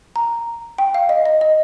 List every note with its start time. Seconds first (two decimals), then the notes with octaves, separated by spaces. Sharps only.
0.16 A#5
0.78 G5
0.94 F5
1.09 D#5
1.25 D#5
1.41 D#5